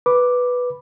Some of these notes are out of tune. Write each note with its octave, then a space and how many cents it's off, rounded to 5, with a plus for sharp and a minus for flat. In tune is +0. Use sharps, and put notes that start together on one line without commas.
B4 +0 B5 +0 D6 +0